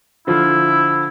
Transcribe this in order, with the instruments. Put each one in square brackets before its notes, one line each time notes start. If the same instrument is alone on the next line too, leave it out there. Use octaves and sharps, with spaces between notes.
[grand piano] D3 F3 F4 [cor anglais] E4